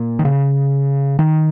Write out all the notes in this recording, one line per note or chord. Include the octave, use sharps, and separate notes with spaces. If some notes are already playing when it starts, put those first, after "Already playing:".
Already playing: A#2
D#3
C#3
D#3